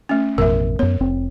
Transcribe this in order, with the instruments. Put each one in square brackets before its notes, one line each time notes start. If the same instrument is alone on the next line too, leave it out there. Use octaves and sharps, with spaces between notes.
[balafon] A3 C#4
[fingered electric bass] A1 F2 B2 [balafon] A#4 E5
[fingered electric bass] F#2 B3 [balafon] C#5
[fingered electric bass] F1 C4